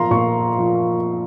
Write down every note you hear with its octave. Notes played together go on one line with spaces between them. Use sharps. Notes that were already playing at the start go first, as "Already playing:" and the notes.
Already playing: A#2 F3 F5 A#5 C6
A#2 C#6
F3